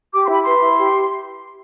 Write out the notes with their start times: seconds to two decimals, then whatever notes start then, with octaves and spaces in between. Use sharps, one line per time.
0.13 G4 D6
0.23 C6
0.28 E4 B5
0.42 B4 C6
0.61 E4
0.77 G4